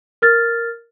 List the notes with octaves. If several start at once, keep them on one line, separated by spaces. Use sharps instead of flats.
A#4 F6 A6